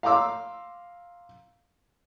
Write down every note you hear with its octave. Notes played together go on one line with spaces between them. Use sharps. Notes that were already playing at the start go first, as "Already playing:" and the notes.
F5 A#5 C6 D6 E6